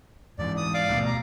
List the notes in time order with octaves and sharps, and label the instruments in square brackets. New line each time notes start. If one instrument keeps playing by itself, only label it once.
[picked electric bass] G#2 E3 [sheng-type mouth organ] D5
[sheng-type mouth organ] D#6
D5 F5 D6
[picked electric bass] D2 B2
[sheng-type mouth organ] A#5